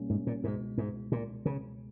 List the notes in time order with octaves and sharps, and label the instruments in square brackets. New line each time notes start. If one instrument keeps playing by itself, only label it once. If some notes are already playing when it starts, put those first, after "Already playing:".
Already playing: [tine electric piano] B1 B2 G3 A#3 C#4
[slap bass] G#2
A#2
[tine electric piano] C#2 B2 G#3 [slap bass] G#2
[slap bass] G#2
A#2
C#3